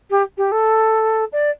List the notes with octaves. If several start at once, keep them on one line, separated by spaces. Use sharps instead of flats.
G4
G4
A4
D5